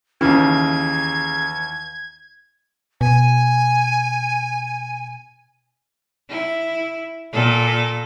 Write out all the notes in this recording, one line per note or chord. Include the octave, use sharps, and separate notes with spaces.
D#2 C#3 E3 G#6
B2 G#5
E4
A#2 A4